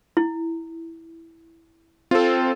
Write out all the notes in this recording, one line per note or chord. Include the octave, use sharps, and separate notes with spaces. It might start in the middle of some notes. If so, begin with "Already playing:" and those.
E4
C4 F4 A4